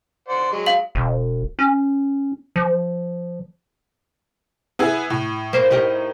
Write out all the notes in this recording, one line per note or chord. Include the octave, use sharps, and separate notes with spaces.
C5 D5 F#5
F#3 G#3
F5 F#7
E1
C#4
F3
B3 E4 G#4
A2
A#3 C5
D#4 G4 A#4